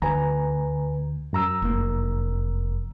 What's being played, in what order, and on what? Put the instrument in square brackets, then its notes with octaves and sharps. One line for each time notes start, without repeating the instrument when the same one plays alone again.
[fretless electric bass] D2 [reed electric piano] B4 G#5 A#5
[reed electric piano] F#2 A#5 E6
[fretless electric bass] F1 A#3